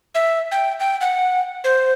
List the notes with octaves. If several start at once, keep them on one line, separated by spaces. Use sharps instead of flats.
E5
G5
G5
F#5
C5